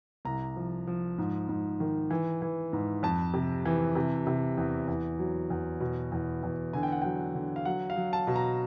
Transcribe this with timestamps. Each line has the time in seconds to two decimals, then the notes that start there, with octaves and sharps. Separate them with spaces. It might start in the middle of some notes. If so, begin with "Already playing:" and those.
0.25 C2 A#5
0.56 F3
0.87 F3
1.18 G#2
1.49 G#2
1.80 D#3
2.10 E3
2.42 E3
2.73 G#2
3.03 F2 A5
3.33 C3
3.65 E3
3.95 C3
4.27 C3
4.57 E2
4.88 E2
5.19 F#3
5.50 E2
5.80 B2
6.12 E2
6.43 E2
6.73 D3 G#5
6.83 G5
6.92 F#5
7.02 F#3 G5
7.35 D3
7.56 F5
7.65 F#3 F#5
7.90 F5
7.96 F#3
8.13 A5
8.27 B2
8.36 A#5